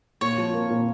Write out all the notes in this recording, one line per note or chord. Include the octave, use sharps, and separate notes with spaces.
A#2 C#5
F3
A#3
A#2